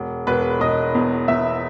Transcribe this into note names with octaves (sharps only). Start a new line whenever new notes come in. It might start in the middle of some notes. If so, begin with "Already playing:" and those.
Already playing: E1
E1 B4
E1 D#5
E2
E2 E5